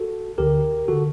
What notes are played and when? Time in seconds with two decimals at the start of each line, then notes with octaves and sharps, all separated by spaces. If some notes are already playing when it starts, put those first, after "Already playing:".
Already playing: F#4 A4
0.38 D2 D3 G4 A#4
0.88 D3 F#4 A4